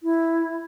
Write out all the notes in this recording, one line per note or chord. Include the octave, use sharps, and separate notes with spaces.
E4